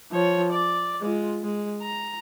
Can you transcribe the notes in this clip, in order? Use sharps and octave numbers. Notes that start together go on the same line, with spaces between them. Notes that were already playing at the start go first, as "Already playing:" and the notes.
F3 C#5
D5
G#3 F4
G#3
A#5